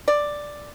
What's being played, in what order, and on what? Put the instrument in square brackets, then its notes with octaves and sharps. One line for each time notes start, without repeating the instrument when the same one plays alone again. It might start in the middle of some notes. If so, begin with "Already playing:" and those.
[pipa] D5